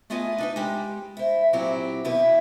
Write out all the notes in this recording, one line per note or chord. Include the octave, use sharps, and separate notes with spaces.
A3 B3 F4 G#4 D#5 G#5
D4 D#4 B4
G#3 G4
E4 C5
A#2 F#3 C4 E4 F#4 G4
E2 B2 E4 B4